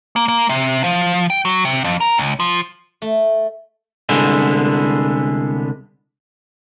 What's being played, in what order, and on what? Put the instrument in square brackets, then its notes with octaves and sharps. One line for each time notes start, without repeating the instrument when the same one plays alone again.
[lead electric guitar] A#3
A#3
C3
F3
G5
F#3
C3
F2
A#4
C#2
F3
[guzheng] A3
[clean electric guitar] C2 D3 G#3 B3